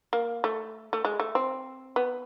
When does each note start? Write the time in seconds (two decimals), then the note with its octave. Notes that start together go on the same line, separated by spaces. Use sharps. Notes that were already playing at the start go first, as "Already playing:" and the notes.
0.13 A#3
0.44 A3
0.93 A3
1.05 G#3
1.20 A3
1.35 C4
1.96 B3